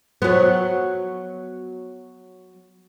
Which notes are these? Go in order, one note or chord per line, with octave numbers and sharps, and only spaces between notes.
F#3 B3